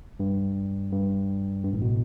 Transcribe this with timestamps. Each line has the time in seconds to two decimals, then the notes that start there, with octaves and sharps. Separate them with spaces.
0.20 G2
0.92 G2
1.64 G2
1.73 A1 A2
1.82 B2